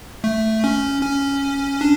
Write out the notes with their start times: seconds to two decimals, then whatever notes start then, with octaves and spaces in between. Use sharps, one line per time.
0.24 A3
0.64 C#4
1.02 C#4
1.81 D4